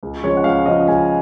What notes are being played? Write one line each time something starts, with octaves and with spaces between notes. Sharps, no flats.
C#2
C#3 F3 G#3 C#4 C#5
F#5
C#2 F5
C#3 F3 G#3 C#4 D#5
C#2 G#5